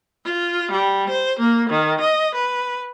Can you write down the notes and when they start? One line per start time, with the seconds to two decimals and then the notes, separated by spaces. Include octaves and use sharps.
0.25 F4
0.72 G3
1.09 C5
1.39 A#3
1.70 D#3
2.00 D#5
2.35 B4